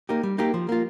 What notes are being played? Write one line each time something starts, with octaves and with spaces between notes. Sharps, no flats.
A#3 D#4 G4
G3
A#3 D#4 G4
F3
A#3 F4